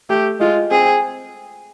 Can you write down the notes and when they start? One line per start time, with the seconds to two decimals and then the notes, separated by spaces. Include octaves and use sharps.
0.09 A3 G4
0.40 G#3 F4
0.71 C4 G#4